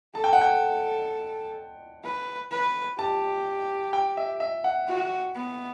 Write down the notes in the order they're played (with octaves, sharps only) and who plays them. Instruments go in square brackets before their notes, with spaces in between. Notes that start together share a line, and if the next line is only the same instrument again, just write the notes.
[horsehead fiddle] A4 [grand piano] A5
[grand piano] G5
F#5
G5
[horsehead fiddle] B4
B4
[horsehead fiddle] G4 [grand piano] A5
[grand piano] G5
E5
E5
F#5
[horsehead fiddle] F#4
B3